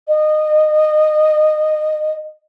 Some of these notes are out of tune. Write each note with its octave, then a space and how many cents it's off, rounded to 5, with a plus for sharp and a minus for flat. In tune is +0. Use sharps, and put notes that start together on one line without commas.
D#5 -20